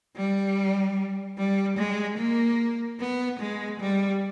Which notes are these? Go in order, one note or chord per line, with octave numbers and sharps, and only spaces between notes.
G3
G3
G#3
A#3
B3
G#3
G3